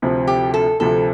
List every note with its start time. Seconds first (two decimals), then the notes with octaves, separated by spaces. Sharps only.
0.02 D2 C3 F3 C4
0.27 G4
0.54 A4
0.80 D2 C3 F3 C4 A4